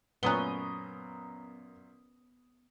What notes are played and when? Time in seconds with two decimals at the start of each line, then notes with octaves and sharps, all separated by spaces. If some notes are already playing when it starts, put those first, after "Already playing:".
0.23 F#2 A#2 B3 C#4 A#5 D#6 F#6 G7